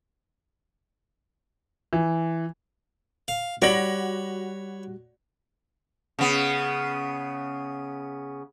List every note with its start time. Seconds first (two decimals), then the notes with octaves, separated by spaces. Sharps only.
1.93 E3
3.28 F5
3.62 G3 F#4 C#5 D5 B5 A#6 F#7
6.19 C#3 B3